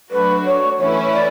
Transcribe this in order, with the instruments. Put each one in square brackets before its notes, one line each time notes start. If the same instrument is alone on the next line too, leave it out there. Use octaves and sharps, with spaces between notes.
[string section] F#3 A3 D4 F#4 [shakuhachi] B4
[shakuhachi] C#5
[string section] E3 A3 C#4 E4 B4 [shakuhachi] C#5
[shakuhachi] D5